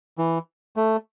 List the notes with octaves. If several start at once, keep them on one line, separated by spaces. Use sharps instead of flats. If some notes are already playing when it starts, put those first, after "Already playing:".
E3
A3